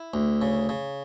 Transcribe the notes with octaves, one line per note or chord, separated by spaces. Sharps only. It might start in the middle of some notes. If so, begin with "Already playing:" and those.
Already playing: E4
D2
C#3
C#3